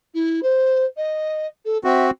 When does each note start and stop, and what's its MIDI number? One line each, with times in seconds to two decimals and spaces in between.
0.14 0.40 64
0.42 0.85 72
0.96 1.46 75
1.65 1.77 69
1.84 2.11 60
1.84 2.11 66
1.84 2.05 76